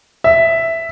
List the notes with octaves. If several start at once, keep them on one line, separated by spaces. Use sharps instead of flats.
E5